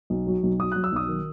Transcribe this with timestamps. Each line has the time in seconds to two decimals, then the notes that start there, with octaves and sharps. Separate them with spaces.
0.10 B1
0.27 F#3
0.43 B1
0.59 F#3 D#6
0.72 F#3 F#6
0.84 E6
0.92 B1 D#6
1.08 D#3